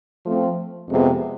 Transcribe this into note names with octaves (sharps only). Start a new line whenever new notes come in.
F3 A3 C4
F2 C3 G#3 B3